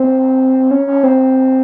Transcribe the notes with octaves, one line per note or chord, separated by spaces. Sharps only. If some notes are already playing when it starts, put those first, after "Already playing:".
Already playing: C4
C#4
C#4
C4